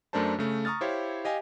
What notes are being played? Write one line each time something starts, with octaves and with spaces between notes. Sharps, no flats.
F#2 A3 D4 A#4 C5 A5
C#3 A3
A#5 C#6 D#6 F6 A6
E4 G4 C5 C#5 F5
G4 D#5 F5 G#5